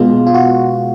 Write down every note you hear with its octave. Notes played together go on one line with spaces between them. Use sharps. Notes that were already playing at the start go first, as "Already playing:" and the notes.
Already playing: B2 G#3 B3 F4
F4
F#4